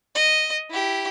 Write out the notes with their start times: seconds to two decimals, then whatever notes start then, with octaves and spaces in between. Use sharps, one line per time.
0.16 D#5
0.70 E4 G4